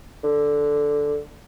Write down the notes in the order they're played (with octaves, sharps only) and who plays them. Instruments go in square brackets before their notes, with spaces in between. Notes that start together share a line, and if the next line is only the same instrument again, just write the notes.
[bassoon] D3